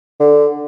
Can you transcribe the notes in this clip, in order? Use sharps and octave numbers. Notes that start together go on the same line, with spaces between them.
D3